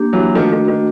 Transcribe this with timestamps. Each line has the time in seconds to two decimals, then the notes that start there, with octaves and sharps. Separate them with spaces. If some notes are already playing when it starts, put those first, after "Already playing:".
Already playing: A#3 D4 G4
0.13 E3 F#3
0.35 D#3 F3 A3 D4 F#4
0.52 D#3
0.68 D#3